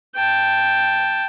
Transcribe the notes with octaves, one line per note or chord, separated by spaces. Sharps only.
G5 A5